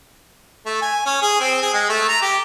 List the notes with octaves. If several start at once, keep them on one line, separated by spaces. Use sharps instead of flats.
A3
G#5
C#4
G#4
C4
G#4
G#3
A3
A#5
G4